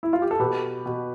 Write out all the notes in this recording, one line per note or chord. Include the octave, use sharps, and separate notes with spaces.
E4
F4
G4
A4
B2 G4 B4
B2